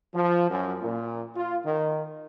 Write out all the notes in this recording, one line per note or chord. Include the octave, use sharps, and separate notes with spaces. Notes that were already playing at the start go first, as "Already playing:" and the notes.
F3
F#2
A#2
F4
D#3